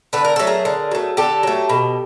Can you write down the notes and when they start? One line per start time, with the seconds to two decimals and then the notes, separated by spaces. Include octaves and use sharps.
0.13 D3 B4
0.25 A#4
0.36 F#3 A3 A4
0.47 G#4 A#4
0.65 D3
0.91 F#3 A3
1.17 D3 G4 A4
1.43 F#3 A3
1.69 B2